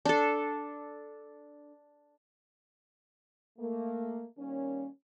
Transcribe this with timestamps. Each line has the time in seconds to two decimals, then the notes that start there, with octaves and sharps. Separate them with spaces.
0.05 D4 A4
3.59 A3 A#3
4.38 D#3 G3 A#3 C#4